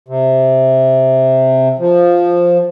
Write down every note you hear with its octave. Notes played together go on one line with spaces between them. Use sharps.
C3
F3